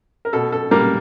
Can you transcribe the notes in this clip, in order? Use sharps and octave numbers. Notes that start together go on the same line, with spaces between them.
A#4
B2 A4
A4
G3 A#3 A#4